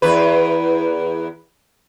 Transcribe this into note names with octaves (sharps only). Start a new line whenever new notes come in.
E2 B4